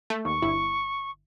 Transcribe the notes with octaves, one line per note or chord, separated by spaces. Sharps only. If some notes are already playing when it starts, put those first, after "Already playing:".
A3
D#2 C#6
G1 E4